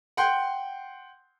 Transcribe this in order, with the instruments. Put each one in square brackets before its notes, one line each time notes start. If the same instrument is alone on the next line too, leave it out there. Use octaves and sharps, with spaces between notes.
[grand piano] F#5 G5 C6 G6